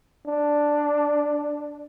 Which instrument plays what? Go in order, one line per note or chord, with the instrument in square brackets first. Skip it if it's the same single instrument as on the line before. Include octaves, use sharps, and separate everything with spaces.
[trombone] D4